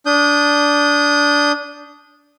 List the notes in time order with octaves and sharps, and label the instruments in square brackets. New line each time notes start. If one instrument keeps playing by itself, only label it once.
[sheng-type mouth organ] D4 D#6 G6